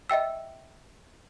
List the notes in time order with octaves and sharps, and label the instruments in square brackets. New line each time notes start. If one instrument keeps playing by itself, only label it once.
[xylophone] D#5 E5 G5 E6